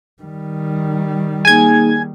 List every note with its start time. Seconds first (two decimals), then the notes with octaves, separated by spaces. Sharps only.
0.22 D#3 G3
1.45 A#3 D#4 G#4 G#5 G#6